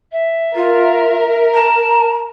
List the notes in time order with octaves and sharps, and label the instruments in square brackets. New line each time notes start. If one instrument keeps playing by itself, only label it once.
[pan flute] E5
[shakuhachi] F4 [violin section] A#4
[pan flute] A5 [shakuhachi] A#5